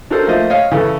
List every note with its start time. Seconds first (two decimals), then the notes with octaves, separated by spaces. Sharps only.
0.10 D4 D#4 F#4 A4 A#4 C5
0.27 F3 A3 A#3 C5 D#5
0.50 C#5 D#5 F5
0.71 C#3 E3 A4